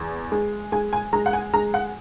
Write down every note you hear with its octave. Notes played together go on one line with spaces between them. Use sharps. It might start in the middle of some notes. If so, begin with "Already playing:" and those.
Already playing: E2
G#3
G#3 G#5
G#5
G#3 A#5
F#5
G#5
G#3 A#5
F#5